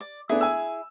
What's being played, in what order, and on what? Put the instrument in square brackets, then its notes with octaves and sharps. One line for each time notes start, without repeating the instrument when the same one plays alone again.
[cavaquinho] D5
[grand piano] A3 B3 D4 [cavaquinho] E4 G#4
[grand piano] G#5 E6